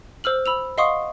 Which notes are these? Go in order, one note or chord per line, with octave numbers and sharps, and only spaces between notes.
C5 E6 F6 F#7
B5 E6 F7
D#5 F5 F#5 C6 C#6 D#6